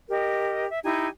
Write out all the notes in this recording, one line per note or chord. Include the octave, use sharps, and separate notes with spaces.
G4 A#4 D#5
E5
D#4 E4 G4 G#5